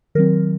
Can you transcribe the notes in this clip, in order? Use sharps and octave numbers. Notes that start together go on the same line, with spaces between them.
D#3 F#3 C4 A#4